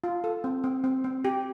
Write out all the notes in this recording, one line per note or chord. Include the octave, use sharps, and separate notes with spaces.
F4
A4
C4
C4
C4
C4
G4